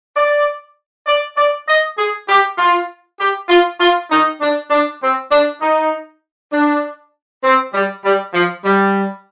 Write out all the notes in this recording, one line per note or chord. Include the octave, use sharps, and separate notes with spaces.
D5
D5
D5
D#5
G#4
G4
F4
G4
F4
F4
D#4
D4
D4
C4
D4
D#4
D4
C4
G3
G3
F3
G3